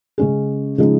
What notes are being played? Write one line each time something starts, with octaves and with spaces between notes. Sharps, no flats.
C#3 G#3 C#4 G#4
C#3 F3 G#3 D#4